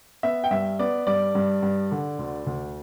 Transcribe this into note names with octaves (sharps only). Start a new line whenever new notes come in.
B3 E5
G5
G2 E5
B3 D5
G2 D5
G2
G2
D3
D2
D2